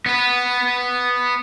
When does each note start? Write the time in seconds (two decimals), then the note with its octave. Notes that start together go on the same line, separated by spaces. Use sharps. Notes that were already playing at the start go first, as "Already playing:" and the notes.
0.06 B3 B4